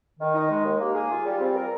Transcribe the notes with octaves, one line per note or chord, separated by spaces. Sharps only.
D#3
D#4
G#3
D#2
A#3
G#4
F4
G3
C4
A#4